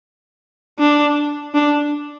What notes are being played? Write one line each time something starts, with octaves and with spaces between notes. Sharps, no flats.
D4
D4